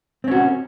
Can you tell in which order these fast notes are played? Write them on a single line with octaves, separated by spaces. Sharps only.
C4 C#4 F#4